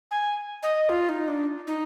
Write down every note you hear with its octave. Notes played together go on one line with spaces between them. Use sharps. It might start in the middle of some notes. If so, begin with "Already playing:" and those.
G#5
D#5
F4
D#4
D4
D#4